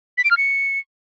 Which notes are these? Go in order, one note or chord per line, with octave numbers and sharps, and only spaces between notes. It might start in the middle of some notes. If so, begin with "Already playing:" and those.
B6
D7
F6
C#7